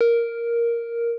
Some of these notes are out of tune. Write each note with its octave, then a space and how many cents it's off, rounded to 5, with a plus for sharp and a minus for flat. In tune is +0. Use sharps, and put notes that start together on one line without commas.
A#4 +0